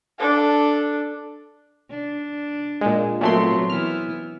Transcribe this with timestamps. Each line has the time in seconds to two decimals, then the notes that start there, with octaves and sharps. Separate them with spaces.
0.19 D4 A4
1.90 D4
2.81 A#2 G#3
3.21 A#2 F#3 A3 B3 C4 C6
3.70 E3 B3 E4 F6